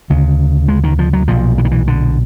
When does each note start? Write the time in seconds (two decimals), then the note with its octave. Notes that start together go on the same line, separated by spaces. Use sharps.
0.10 D2 C#3
0.68 G#3
0.84 D#3
0.99 F3
1.13 F#3
1.28 B1 A#2 F3
1.58 E3
1.65 D#3
1.71 E3
1.87 D3